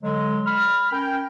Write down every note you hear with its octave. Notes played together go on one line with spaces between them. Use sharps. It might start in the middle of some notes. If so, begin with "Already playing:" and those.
D3 F#3 G#3
B5 F6
C#4 A#4 G5